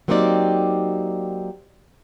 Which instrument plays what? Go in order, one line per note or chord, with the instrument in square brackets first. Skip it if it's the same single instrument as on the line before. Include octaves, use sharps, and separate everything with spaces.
[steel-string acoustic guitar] F#3 A#3 C4 D#4 G4 D5